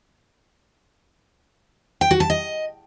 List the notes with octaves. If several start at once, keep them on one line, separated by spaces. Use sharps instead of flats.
G5
F#4
A5
D#5